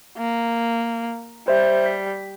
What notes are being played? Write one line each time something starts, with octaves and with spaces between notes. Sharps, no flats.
A#3
G3 C5 E5
B6